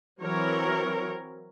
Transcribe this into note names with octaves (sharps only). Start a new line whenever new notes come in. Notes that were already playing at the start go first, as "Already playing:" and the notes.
E3 F#3 C4 A#4 C#5